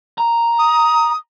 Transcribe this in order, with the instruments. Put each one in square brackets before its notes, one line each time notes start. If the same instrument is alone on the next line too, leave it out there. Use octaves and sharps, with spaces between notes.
[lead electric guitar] A#5
[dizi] D#6